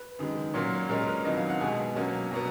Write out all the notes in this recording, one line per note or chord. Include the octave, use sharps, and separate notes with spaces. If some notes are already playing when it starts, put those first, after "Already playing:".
Already playing: B4
F#2 D#3 G#3
A#2 F#3 A#3 C#4
A#2 G#3 C#4 A#4
A#4
B4
F2 D#3 F#3 D#5
F5
F#5
B2 G#3 B3 G#5
B2 F#3 A#3 C#4
B2 F#3 B3 A#5